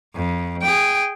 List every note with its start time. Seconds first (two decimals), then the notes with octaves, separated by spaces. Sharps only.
0.15 F2
0.62 G#4 G5